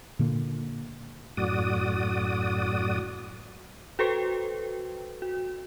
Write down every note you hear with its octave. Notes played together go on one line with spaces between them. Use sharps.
A#2 D3 A#3
F#2 A2 F#4 D5 D#6
F#4 A4 B4 C5 G5
F#4